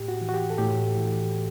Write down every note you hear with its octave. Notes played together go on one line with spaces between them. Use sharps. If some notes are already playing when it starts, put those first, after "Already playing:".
Already playing: A2 G4
F#4
E3
F#4
G4
A4
A2 G4
E3